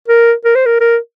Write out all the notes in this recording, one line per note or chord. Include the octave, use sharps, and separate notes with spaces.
A#4
A#4
C5
A#4
A#4